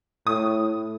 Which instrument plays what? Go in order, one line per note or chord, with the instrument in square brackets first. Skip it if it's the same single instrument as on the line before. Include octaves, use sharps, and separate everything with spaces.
[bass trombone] A2 [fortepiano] D#6